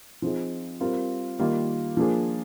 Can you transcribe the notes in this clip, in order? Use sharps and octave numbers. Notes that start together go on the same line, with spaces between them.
F3 C4 D#4 G#4
G3 C4 F4 A#4
D#3 G3 A#3 F4
F3 A#3 D4 G#4